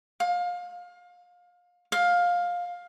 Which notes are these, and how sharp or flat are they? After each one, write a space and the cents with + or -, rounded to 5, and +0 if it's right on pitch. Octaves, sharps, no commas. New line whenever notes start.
F5 +25
F5 +15